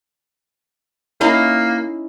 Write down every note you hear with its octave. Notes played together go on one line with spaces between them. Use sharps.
A#3 C#4 D#4 E4